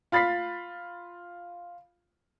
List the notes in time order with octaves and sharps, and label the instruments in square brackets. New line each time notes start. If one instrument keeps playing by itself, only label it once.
[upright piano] F4 B5 A6 B6 C7